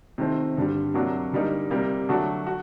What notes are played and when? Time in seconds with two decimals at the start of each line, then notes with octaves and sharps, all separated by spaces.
0.18 C3 D#3 A3 C4
0.57 G2 D3 G3
0.94 C3 F#3 A#3 D4 F#4
1.33 D3 G3 A#3 D#4
1.71 C3 G3 A#3
2.09 D3 F#3 A3 D4 F#4
2.47 F#4